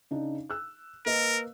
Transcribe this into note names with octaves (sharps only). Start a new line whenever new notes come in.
C#3 D4 D#4
E6 F#6
A#3 A#4 B4 D#5